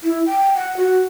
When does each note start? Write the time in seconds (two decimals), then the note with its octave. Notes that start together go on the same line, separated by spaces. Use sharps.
0.03 E4
0.26 G5
0.55 F#5
0.77 F#4